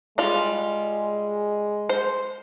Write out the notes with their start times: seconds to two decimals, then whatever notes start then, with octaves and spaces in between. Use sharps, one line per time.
0.18 G3 G#3 F4
1.89 C5